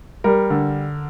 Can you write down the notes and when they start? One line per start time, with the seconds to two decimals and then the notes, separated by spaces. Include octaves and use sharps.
0.24 G3 A#4
0.50 D3